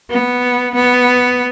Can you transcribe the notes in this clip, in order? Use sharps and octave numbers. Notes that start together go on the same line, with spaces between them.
B3
B3